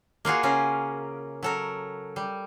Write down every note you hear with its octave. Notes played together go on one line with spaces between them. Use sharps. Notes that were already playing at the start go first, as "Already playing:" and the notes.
A#3 F4 F#4 G#4
C#3 C#4 G#4 A#4
F#3 A4 A#4
G3